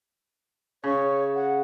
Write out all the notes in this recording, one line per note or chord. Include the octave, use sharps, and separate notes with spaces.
C#3 C#5
F#5